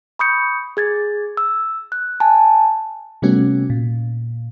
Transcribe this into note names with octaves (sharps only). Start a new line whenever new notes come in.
B5 C#6 D#6 G6 C#7
G#4 G#6 A6
E6
F#6
G#5 A5
C3 G3 A3 B3 C#4 F#4
A#2